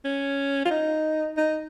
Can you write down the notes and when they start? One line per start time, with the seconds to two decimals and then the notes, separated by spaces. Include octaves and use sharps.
0.05 C#4
0.66 F4
0.71 D#4
1.37 D#4